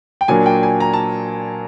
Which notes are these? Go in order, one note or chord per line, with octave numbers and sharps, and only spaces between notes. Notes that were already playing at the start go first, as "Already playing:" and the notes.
G5
A#2 F#3 A#3 D4 G#5
G5
G#5
A#5
A5